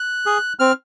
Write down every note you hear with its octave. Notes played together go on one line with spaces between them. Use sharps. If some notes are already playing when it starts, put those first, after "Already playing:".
Already playing: F#6
G#4
C4 F6